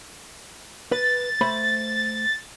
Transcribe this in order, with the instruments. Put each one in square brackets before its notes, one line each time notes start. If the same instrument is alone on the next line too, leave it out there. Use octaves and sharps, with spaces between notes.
[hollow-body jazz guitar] B4 [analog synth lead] A6
[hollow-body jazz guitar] A3 C5 B5